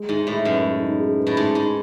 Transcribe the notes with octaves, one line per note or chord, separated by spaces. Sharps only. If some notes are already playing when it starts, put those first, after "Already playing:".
Already playing: G#3
G#2 D#4
A2 G#4
F#2 B4
G#3
D#4
G#4
B4
A2
G#2 G#3
G#2 D#4